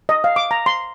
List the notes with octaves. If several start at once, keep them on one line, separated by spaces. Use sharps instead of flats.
D#5
F5
D6
A#5
C6